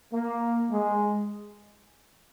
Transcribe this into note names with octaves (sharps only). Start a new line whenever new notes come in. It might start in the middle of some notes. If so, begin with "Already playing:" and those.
A#3
G#3